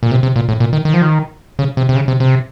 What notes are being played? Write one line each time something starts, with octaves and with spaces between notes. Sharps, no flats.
A#2
C3
C3
A#2
A2
A#2
D#3
D#3
F3
D#3
C#3
C3
C3
C#3
C3
C3